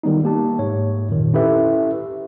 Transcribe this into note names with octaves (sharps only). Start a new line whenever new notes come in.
D#3 G3 B3 D#4
A#3 G4 A5
G#2 C#5
F2 A#2 D#3
C#4 E4 G4 A4 B4 E5